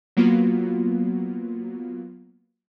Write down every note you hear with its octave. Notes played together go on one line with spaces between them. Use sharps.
F#3 A#3 B3 F4 F#4